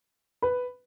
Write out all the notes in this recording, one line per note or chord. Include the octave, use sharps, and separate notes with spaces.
B4